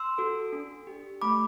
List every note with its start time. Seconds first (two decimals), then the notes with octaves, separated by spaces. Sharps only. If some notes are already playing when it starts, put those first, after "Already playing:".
Already playing: C6 E6
0.18 F#4 A4
0.53 D4
0.87 G4
1.22 A3 B5 D6